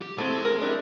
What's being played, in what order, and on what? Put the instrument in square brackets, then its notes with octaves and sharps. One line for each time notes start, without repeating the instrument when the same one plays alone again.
[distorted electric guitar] G4
[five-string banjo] A3 C4 E4 [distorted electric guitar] G#4 C6
[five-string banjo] A#4
D4 E4 G4